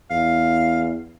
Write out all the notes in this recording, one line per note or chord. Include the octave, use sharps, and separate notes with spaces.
E2 F5